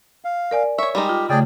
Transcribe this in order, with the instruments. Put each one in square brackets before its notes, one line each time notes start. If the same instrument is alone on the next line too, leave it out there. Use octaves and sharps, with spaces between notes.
[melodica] F5
[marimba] A#4 D5 G#5
[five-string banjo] C#5 E5 [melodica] C#6
[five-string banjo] G3 G#3 D#4 [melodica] G4
[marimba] F4
[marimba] C#3 A3 [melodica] G#4 D5 G5